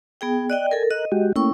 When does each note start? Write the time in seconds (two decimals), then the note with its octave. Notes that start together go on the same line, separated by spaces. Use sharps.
0.21 B3 G#4 G5
0.50 D5 D#5 G5 F#6
0.71 A4 A#4 G#5
0.91 A#4 D#5 F#6
1.12 G#3 F#4 G4
1.36 A3 A#3 C#4 E4 G5 C#6